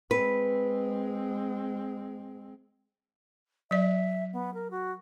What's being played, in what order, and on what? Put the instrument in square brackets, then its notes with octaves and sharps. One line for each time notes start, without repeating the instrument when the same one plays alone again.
[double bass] G#3 C4 [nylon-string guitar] B4
[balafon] F#3 D5 [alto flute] E5
[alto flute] B3
A#4
F#4